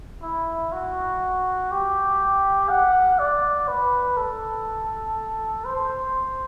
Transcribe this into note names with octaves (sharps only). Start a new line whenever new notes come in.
E4
F#4
G4
F#5
D5
B4
A4
C5